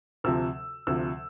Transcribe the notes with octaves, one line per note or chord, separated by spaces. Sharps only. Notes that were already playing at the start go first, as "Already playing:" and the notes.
D2 C3 F3 E6
D2 C3 F3 E6